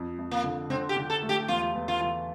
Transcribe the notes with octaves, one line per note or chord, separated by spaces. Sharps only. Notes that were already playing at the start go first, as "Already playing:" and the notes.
Already playing: F2
F2
A#3
D3
D3 C4
G4
D3
A4
A3
G4
E2 F4
E2
F4
E3